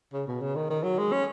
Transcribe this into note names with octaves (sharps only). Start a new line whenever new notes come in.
C#3
B2
C#3
D#3
D#3
F#3
G#3
C#4